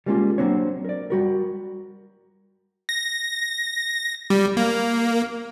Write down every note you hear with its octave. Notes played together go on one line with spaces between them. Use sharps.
G3 G#3 A#3 C#4 D4 F4
F#3 A#3 C4 D4 C#5
A#4 D5
G3 F#4 A#4
A#6
G3
A#3